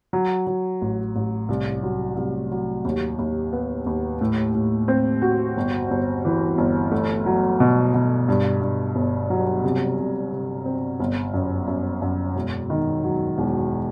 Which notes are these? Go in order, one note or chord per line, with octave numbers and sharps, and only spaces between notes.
F#3
F#3
A1
A1
C2
F#3
C2
F#3
D#2
D#2
B3
D#2
A2
A2
C4
F#4
G1
G1
E3
G1
A3
F#3
B2
B2
G2
G2
G1
F#3
C3
C3
C3
C4
G1
F#2
F#2
F#2
E1
D#3
F#3
E1